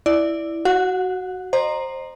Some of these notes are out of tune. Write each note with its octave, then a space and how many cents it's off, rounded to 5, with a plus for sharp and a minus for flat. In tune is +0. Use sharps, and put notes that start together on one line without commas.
E4 +0 D5 +0
F#4 +10 F#5 -30
C5 +10 D#5 -35 A#5 +0